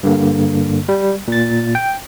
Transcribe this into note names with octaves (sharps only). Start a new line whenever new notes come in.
G2 D3 A#3
G3
A#2 A6
G5